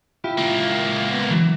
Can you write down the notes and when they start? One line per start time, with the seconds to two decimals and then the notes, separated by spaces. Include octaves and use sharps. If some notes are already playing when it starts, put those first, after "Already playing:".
0.24 E4 F4 G4
0.38 C#2 A#3
1.11 B3
1.30 E3 F#3